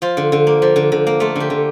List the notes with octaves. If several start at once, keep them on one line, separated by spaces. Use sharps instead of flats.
F3 F4
D3
D3
A#3
F3
D3
D3
A#3
A3 F4
D3 G4
D3